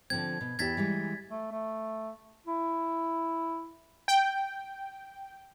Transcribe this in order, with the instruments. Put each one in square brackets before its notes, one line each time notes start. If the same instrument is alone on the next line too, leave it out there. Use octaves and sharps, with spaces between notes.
[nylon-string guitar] D3 F3 C4 [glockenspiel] G#6
[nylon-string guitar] B2
[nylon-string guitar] E2 E4 G4 [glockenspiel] G#6 A6 B6
[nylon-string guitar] E3 G3 G#3
[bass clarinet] A3
A3
E4
[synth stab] G5